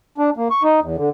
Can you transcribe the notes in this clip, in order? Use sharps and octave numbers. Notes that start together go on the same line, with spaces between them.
D4
A#3
C#6
D#4
E2
D3